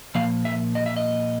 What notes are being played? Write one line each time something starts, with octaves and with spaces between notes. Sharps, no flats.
A#2 F3 A#3 F5
E5
D#5
E5
D#5